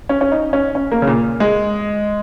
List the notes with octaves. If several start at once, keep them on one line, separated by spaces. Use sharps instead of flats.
C#4
C#4
D#4
C#4
C#4
A#3
C#3
A#2
G#3